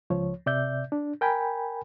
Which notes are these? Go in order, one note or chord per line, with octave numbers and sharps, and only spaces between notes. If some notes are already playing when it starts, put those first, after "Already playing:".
C#2 F3 C#5
C3 D5 E5 G6
D4
A#4 G5 G#5 B5